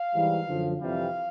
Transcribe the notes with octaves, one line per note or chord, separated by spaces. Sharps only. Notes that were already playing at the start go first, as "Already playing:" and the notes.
Already playing: F5
G#2 E3 G3
F#2 D3 F3
F2 C3 E3 G3 F5